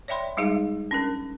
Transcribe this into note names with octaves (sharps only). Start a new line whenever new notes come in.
C#5 D5 E5 G5 B5 C6
G3 G#3 D#4 G#4 F5
C#4 D4 A#4